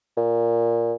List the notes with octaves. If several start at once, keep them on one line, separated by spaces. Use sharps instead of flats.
A#2